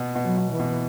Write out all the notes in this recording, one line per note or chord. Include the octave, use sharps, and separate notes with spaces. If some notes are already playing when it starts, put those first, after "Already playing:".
Already playing: B2
B2
F#3
B2
E3
B2